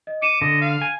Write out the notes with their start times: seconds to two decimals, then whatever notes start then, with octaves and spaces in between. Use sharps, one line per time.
0.07 D#5
0.22 D6 C#7 D#7 E7
0.42 D3 D#5
0.61 F5
0.82 G#5